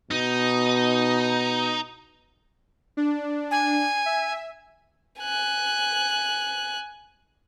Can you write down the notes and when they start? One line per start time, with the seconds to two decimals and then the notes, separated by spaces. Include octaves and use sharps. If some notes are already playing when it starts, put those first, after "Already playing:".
0.11 B2 D#4
2.97 D4
3.51 G#5
4.06 E5
5.20 G#5 F#6